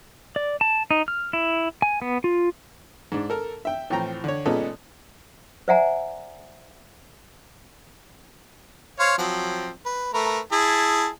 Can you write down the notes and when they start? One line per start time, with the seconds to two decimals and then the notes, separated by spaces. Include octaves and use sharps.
0.36 D5
0.61 A5
0.91 D#4
1.08 F6
1.33 E4
1.82 G#5
2.02 B3
2.24 F4
3.12 G#2 D4
3.30 A4 A#4
3.65 E5 G5
3.90 A2 E3 F3 C4 G5 A#5
4.24 D3 C#5
4.46 A#2 G#3 B3 C#4 D#4 A4
5.68 C5 D5 E5 F#5 G#5 A#5
8.99 C5 C#5 F5
9.18 F3 F#3 C4
9.86 B4
10.14 A3 A#4 B4
10.52 E4 G#4 A5